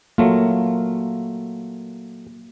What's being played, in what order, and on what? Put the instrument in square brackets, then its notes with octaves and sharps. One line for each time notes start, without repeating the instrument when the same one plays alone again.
[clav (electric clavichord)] F#3 A3 F4 [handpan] A#3